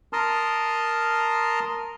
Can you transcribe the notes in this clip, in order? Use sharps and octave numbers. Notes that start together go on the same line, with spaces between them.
A#4 A5 A#5 C6 D#6 F6